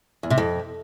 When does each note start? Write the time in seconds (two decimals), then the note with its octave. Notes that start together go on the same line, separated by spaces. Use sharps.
0.23 E2
0.30 C3
0.38 F2